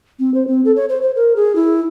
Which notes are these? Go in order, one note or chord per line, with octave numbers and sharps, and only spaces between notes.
C4
C5
C4
A4
C#5
C5
C5
A#4
G#4
E4